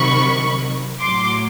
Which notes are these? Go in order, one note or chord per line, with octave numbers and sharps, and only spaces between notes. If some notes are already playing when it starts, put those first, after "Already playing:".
Already playing: C3 D#3 F#3 B5 C#6
A2 F#3 C6 D6